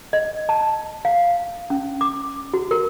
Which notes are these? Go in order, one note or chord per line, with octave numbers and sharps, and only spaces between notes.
D#5
A5
F5
C#4
D6
F#4
A#4